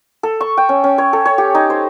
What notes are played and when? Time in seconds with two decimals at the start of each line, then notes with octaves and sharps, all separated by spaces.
0.23 A4
0.41 C#6
0.57 G5
0.69 C#4
0.84 C#4
0.98 C#5
1.13 A4
1.25 C#5
1.38 G4
1.55 D#4
1.70 C5